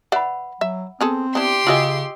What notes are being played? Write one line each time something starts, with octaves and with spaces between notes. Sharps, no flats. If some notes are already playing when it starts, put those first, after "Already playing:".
B4 D5 E5 F#5 B5
F#3 E5
B3 C4 G#4 A4
B3 D4 E4 G4 C6
C#3 F4 F#4 G#4 D#5 D#6 E6